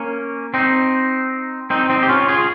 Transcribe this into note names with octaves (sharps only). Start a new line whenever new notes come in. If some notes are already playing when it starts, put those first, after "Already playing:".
Already playing: A#3 C#4
C4 D#4
C4 D#4
C4 D#4
G4
C#4 F4
F4 G#4